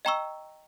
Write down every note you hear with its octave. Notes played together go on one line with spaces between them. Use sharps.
D#5 G5 A#5 C#6 E6